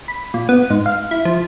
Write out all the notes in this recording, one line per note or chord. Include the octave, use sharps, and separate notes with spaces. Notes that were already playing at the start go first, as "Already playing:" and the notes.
B5
A#2
B3
G#2
F5
E4
F3